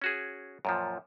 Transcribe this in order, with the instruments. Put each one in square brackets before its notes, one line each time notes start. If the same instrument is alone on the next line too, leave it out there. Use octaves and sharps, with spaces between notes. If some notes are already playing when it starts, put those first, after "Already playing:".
[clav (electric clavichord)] C#4 F#4 G#4
F#2 A#2 F3